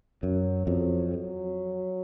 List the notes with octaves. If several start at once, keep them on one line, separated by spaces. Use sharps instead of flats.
F#2 F#3
F2 F#3
F#3